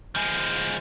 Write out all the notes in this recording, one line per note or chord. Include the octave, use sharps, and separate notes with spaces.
F3 G#3